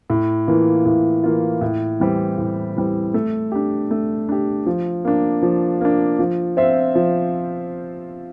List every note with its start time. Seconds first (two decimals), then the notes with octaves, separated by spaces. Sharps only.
0.10 A2
0.47 E3 A#3 F4
0.86 A2
1.24 E3 A#3 F4
1.61 A2
2.00 E3 G3 C4
2.38 A2
2.76 E3 G3 C4
3.14 A3
3.52 D4 G4
3.91 A3
4.29 D4 G4
4.66 F3
5.05 A#3 D4
5.43 F3
5.81 A#3 D4
6.19 F3
6.57 C4 F4 C5 E5
6.95 F3